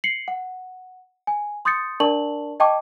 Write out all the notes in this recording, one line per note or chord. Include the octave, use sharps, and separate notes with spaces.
C7 C#7 F#7
F#5
G#5
C6 D#6 G6 A6 C#7
D4 A#4 D5 A5 C#6 F#7
D#5 G5 A5 C#6 D6